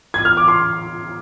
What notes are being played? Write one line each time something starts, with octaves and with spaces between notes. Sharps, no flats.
G#6
F6
D6
C6